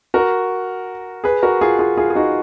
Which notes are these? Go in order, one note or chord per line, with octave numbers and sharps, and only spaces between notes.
F#4 A#4
G#4 B4
F#4 A#4
F4 G#4
F4 G#4
F4 G#4
G#4
D#4 F#4